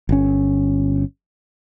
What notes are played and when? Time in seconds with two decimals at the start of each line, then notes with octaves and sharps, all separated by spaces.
0.09 G1 C#4